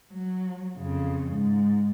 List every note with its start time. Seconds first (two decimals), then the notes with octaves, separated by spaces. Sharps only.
0.11 F#3
0.77 F2 C#3
1.32 G#2